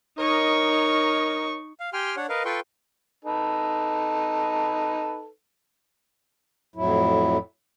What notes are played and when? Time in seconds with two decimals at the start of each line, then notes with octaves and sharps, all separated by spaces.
0.18 D#4 A#4 C#5 D#5 C#6
1.80 F5
1.93 G4 G5 G#5 C6 F6
2.17 D4 C#5 F#5
2.29 A#4 B4 D#5 F5
2.45 F4 A4 B4 G5 C6 C#6
3.25 D#4 A4 B4
6.76 F2 A2 F#3 E4